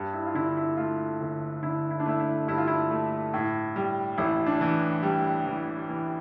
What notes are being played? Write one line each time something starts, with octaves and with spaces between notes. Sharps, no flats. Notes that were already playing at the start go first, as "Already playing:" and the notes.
Already playing: G2
E4
F4
D3 E4
E4
A3 F4
G1
D3 E4
E4
D4
A3 E4
E4
G2 E4
F4
E4
A3
A2
G3
A1 E4
D4
E3
G3
E3
E3